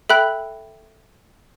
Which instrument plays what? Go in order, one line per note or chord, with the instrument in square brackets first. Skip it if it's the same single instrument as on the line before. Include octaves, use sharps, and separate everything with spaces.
[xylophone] A4 E5 G5 B5 F#6